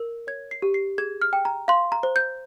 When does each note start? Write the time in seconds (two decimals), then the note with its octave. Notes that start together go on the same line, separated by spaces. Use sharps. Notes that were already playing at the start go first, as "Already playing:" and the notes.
Already playing: A#4
0.27 C#5 G#6
0.51 C7
0.62 G4
0.74 C7
0.98 G#4 G#6
1.22 F6
1.33 G5
1.45 A#5
1.68 F5 C6
1.92 A#5
2.03 C5
2.16 G6